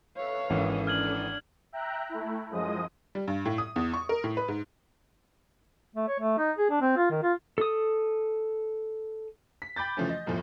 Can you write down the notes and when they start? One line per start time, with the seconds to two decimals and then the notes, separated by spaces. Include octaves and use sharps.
0.16 A4 B4 C#5 E5 F5
0.50 G#1 E3 C#4 A4 D#6
0.87 D4 F6 G#6 F#7
1.72 E5 G5 A#5 F#6
2.09 A3 E4
2.50 F#2 F3 G#3 D#5 D#6
3.15 G3
3.28 G2
3.45 A2
3.58 D#6
3.76 E2
3.94 C#6
4.09 A#4
4.24 A2
4.37 B4
4.48 G#2
5.96 A3
6.08 C#5
6.20 A3
6.38 D#4
6.58 G#4
6.70 D4
6.82 C4
6.97 F4
7.11 D#3
7.23 F4
7.58 A4 D#6
9.62 B6
9.76 G5 B5 D6 G6 A6
9.97 C#3 E3 F3 A3 C#4
10.09 D#5
10.26 G1 E2 A2 F3